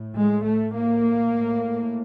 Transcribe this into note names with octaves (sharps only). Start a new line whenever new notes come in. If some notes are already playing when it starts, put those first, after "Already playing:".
Already playing: A2
G#3
A3
A#3
A2